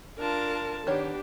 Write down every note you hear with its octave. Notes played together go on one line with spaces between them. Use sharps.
D4 F4 A#4 A5
D#3 B3 D4 G4 C#5